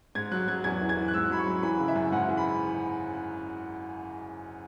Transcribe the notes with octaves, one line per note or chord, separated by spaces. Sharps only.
G#2 G#6
F#3 F#6
F#3 G#6
E2 G#6
E3
G#6
E3
F#6
G#2 E6
F#3 B5
C#6
F#3
E3 B5
C#3
E5
F#2
G#2 F#5
E3
B5